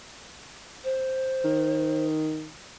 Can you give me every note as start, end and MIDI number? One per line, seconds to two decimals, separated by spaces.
0.84 2.06 72
1.44 2.49 51